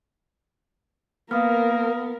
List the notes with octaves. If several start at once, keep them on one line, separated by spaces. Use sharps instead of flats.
A#3 B3 A#4 F5 D#6 F6